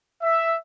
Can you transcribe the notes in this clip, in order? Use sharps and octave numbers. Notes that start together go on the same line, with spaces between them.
E5